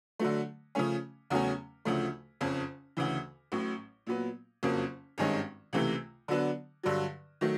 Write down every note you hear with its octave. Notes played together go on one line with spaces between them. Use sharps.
D3 F#3 A3
C#3 F3 A3 C#4
E2 C#3 F#3 A3 C#4
D2 C#3 F3 A3
F#1 F2 C#3
D2 C#3 E3
A1 A2 F#3
A#2 F#3 B3
F#1 F2 C#3 F#3 A#3
G#1 G2 D#3 G#3 C#4
C#2 C3 E3 A3
D3 F#3 B3 D4
G2 D3 F#3
D#3 F#3 A3